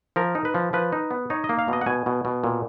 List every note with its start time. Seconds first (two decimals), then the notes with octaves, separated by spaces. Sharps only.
0.16 F3 A#4
0.35 D#4
0.45 B4
0.54 F3
0.73 F3 B4
0.92 D#4
1.11 B3
1.30 D#4 C#5
1.44 D#5
1.49 A#3
1.59 F5
1.68 B2 D#5
1.81 F#5
1.86 B2 G#5
2.06 B2
2.25 B2
2.44 A#2